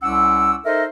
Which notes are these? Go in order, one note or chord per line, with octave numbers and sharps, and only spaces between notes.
C2 C#4 F#5 D6 E6
D#4 A4 A#4 C5 D#5 E5